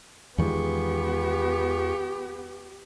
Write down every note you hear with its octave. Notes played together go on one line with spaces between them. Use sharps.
E2 D#3 G#3 B3 F4 G4 G#4 C#6